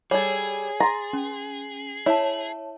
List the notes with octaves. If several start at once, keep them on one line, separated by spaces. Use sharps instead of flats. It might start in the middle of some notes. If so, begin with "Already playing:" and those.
G3 G#4 A4 C#5 G#6
A#5 C6 A6
C#4
E4 C#5 A5